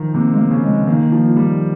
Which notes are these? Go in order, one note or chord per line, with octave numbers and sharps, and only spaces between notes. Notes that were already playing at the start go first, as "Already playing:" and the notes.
Already playing: D#3 F3
C3 A#3
G#3
A#3
C#3
G#3
D#3 A#3
F3
G3